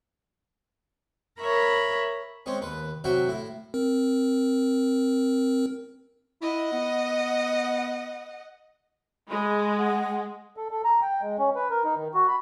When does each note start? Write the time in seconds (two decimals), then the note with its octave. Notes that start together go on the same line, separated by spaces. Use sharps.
1.39 A#4 C#5 E5 B5
2.46 G#3 C4 C#4 G#4
2.61 D#2 B4
3.04 C3 F#3 F#4 E5 G5
3.27 A2 E4
3.74 C4 A#4
6.42 E4 D#5 F#5
6.73 B3
9.29 G#3 B5
9.78 F#5
10.57 A4
10.71 A4
10.85 A#5
11.02 G5
11.22 G#3
11.39 C#4
11.55 B4
11.70 A#4
11.84 D#4
11.96 D#3
12.14 F#4
12.27 B5